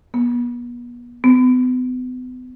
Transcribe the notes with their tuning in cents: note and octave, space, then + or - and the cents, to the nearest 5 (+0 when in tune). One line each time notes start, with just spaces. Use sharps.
B3 -35
B3 +35